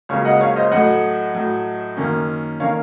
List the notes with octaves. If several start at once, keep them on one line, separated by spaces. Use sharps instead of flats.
C#2 C#3 F#3 A#3 C#5 F5
D#5 F#5
C#5 F5
C5 D#5
A2 F#3 A3 D#5 F#5
A2 F#3 A3
F#2 D#3 A#3 C#4
D#3 A#3 C#4 C#5 F5